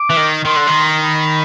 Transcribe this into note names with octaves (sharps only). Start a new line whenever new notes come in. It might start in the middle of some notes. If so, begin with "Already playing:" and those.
Already playing: D6
E3
D#3
D#3 C6
D3
D#3
B5